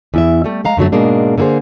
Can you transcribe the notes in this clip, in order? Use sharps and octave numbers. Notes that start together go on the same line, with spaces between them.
E2 E4 E5
G3 A3
G#3 F5 A#5
F#2 D3 F#3 A3
G#2 B2 G#3 A#3 D4
D3 A#3 E4 G#4 C5